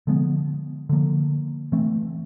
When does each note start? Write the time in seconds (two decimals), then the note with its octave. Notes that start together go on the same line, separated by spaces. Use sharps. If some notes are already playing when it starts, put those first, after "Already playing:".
0.07 D3 F3 G#3 B3
0.89 D3 F3 A#3
1.72 E3 A3 C4